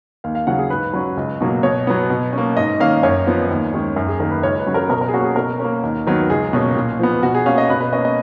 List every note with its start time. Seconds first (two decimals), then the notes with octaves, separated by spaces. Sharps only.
0.24 D#2 F5
0.35 F5
0.47 C#3 F#3 F#5
0.59 G#4
0.70 G#2 B4
0.93 F#3 C#4
1.17 C#2
1.41 B2 F#3 A#3
1.63 B2 C#5
1.87 F#3 B3
2.10 B2
2.33 A#3 C#4
2.57 G#2 D#5
2.80 D#3 A#3 C#4 F5
3.03 F#2 C#5
3.27 F3 B3
3.50 D#2
3.73 D#3 G#3 C#4
3.96 F#2
4.08 G#4
4.20 D#3 A#3 A#4
4.31 B4
4.43 C#2 C#5
4.59 B4
4.67 C#3 F#3 C#4
4.74 A#4
4.89 B2 A#4
5.01 A#4
5.09 G#4
5.13 A#3 C#4 F#4
5.24 G#4
5.36 B2 A#4
5.59 C#4
5.64 A#3
5.83 D#2
6.06 D#3 F#3 B3
6.30 C#2 G#4
6.53 B2 A#3 C#4
6.76 A#2
6.99 F3 B3
7.23 B2 F#4
7.35 G#4
7.46 A#3 C#4 F5
7.58 D#5
7.69 B2 B4
7.81 B4
7.93 C#4 D#5
7.97 A#3
8.05 D#5